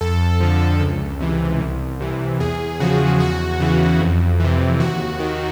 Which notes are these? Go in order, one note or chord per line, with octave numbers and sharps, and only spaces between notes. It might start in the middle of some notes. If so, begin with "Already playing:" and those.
F2 A4
D3 F3
C#2
C3 E3
C2
C3 E3
E2 G#4
C#3 F3 F#4
E2 F#4
C#3 E3
F2
C3 E3
D#2 F#4
D#3